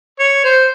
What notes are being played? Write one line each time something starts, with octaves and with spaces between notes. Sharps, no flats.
C#5
C5